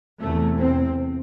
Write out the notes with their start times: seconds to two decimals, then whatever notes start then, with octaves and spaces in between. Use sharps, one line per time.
0.20 E2 C3 A3
0.59 C4